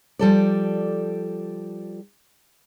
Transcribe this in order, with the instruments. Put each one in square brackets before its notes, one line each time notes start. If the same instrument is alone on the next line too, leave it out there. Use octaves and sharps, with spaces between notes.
[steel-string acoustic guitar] F3 G3 A4 D5